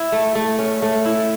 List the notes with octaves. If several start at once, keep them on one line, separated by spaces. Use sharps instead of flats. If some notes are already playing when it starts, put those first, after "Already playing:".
Already playing: E4
A3
A3
C#4
A3
E4